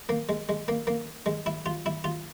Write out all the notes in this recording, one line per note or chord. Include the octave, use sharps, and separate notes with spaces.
A#3
G#3
G#3
A#3
A#3
G#3
E4
F4
E4
F4